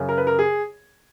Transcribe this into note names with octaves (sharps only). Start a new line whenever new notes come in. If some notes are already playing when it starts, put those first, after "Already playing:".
Already playing: F#2 C#3
A#4
B4
A#4
G#4